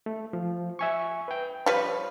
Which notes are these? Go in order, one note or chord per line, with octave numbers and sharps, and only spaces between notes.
A3
F3
E5 G#5 C#6
B4 G5
F3 G3 B4 C#5 B5